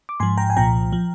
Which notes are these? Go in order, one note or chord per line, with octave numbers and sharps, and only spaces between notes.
D6
G#2 F3 G#5 C6
G5 A#5
G#5
C2 A#2 F3 G5 A#5
F3